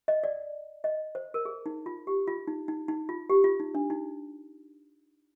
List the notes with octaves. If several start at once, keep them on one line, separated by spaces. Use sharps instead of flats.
D#5
D5
D#5
C5
A#4
G#4
D#4
F4
G4
F4
D#4
D#4
D#4
F4
G4
F4
D#4
D4
D#4